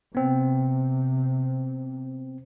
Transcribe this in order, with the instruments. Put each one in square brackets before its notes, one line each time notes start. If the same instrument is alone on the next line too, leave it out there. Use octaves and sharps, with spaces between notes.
[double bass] C3 [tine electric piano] B3 C4